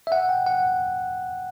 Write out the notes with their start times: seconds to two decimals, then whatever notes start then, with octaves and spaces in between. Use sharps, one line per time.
0.07 E5
0.12 F#5
0.29 G5
0.46 F#5